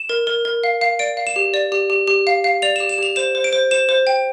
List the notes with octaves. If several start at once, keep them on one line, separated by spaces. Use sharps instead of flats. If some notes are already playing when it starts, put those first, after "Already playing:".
Already playing: E7
A#4
A#4
A#4
F5
F5
D5 D7
F5
E7
G4
D5
G4
G4
G4
F5
F5
D5 F7
E7
G4
E7
G4 F7
C5 E7
C5
D7
C5
C5 E7
C5
G5